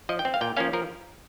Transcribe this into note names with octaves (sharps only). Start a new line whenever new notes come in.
F3 D#5
G5
C4
F5
A#2 G5
F3 A#3 C#4 F5
F3 A#4